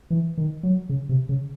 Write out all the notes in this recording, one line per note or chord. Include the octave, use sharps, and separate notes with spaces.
E3
D#3
F#3
C#3
C3
C#3